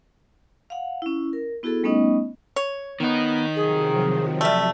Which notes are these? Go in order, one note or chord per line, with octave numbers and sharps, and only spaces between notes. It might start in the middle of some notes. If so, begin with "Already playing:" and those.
F5 F#5
C#4 E4
A#4
B3 E4 F#4 G#4 A4
G3 A3 B3 C#4 D#4 D#5
C#5
D#3 B3 D#4 B6
C3 F3 F#3 G#4
G3 A3 E5